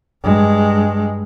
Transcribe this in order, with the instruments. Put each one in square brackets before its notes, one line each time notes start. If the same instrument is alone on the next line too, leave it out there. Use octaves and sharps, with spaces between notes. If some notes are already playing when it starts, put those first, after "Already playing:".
[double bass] G2 G#3